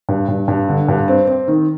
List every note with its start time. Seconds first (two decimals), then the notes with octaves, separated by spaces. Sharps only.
0.09 G2
0.28 G2
0.48 G2
0.69 D3
0.88 G2
1.08 C4
1.28 C4
1.48 D#3